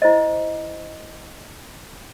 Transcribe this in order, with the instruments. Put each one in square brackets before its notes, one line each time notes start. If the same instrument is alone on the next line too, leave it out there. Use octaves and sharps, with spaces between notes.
[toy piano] E4 C5 D#5